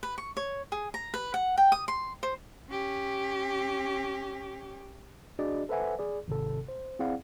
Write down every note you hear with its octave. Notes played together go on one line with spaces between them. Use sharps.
B4
C#6
C#5
G#4
A#5
B4
F#5
G5
D#6
C6
C5
C#4 G4
D4 F#4 G#4 D5 D#5
A4 B4 C5 E5 F#5 G#5
G#4 D5
G#1 C3 A4
C5
C4 E4 G#4 D5 F5 F#5